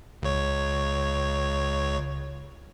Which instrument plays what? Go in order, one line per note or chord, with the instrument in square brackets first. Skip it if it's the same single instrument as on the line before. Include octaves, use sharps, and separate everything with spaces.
[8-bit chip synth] C#2 C#5